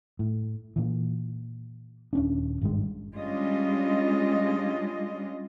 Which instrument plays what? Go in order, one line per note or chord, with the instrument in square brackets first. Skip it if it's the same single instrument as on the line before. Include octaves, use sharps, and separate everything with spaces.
[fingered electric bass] A2
A#2 E3
D#1 C#4 D4
G#1 G2 G#3
[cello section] G3 G#3 C#4 D4 F4 D#5